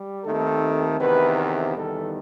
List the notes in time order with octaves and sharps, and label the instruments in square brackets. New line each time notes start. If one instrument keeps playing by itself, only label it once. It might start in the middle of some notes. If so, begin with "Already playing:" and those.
Already playing: [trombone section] G3
D#2 D#3 A3 C4 A4
E2 C3 D#3 B4
B4
E2 D#3 G3 A4